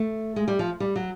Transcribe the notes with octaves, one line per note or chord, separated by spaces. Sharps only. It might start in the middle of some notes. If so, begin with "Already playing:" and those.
Already playing: A3
G#3
G3
F3
G3
F#3